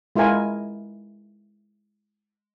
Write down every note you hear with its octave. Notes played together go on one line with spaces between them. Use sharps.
G#3 E4 F4 A#4 G#5